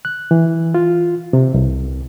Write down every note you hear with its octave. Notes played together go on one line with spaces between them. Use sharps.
F#6
E3
F4
C3
C2